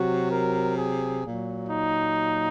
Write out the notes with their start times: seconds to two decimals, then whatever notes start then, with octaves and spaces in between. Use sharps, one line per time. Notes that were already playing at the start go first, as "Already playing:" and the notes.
Already playing: C3 F#3 F#4
0.29 A#4
0.76 G#4
1.22 A#2 F#3
1.68 D#4